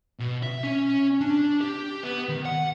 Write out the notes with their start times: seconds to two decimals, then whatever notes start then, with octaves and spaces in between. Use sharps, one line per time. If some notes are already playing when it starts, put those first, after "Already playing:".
0.19 B2
0.43 E5
0.63 C#4
1.21 D4
1.61 G4
2.03 B3
2.29 D#3
2.45 F#5